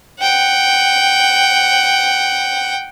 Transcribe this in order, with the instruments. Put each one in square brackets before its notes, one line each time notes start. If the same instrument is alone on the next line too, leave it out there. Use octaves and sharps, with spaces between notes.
[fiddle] F#5 G5